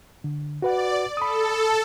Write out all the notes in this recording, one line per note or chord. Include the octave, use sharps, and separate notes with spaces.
D3
F#4 B4 D5 F#5
A4 B5 D#6